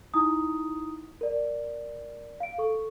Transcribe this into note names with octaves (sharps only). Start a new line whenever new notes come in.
D#4 E4 A#5 D#6
A#4 D5
F5 D7
A4 C#6